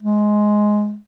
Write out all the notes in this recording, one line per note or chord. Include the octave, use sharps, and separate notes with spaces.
G#3